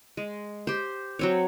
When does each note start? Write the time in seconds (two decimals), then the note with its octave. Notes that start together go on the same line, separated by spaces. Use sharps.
0.17 G#3
0.67 G4 C5
1.19 F#3 C4 C#5